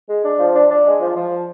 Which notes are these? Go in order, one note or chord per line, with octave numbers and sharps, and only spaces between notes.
G#3
D4
F3
D4
D4
G#3
F3
F3